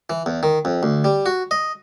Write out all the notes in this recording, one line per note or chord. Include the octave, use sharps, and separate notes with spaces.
E3
E2
D#3
F2
D2
G3
F#4
D#5